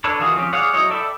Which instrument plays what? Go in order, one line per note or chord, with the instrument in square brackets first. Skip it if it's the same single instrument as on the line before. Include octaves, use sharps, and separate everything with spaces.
[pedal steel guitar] D4 A4 B4 C#5
D#3 E3 F4 F#4 G#4
F3 C4 C#4 G4
G#4 C#5 D5 F5 F#5
F#3 D#4 E4 C#5
A4 D5 E5 G5 B5